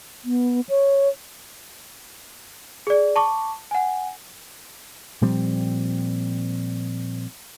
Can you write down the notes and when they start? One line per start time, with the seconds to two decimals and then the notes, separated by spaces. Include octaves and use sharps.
0.25 B3
0.69 C#5
2.87 G#4 D5
3.16 A5 C#6 D6
3.71 F#5 G#5
5.21 A#2 F3 G3 C4